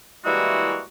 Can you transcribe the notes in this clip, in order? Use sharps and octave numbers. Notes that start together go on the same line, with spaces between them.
E3 G3 G#3 A#3 E4 F#4